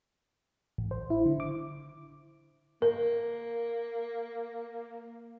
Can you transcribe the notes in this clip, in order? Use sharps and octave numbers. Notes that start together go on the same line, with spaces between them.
A1
C5
E4
D3
D6
A#3 A#4